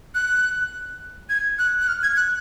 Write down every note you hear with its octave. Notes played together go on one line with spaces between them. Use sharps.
F#6
G#6
F#6
F#6
F6
G#6
F#6